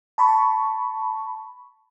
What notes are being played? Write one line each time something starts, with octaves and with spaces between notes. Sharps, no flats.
A5 B5 C#6